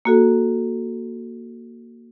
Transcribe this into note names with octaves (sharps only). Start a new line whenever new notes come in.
A#3 F#4 A4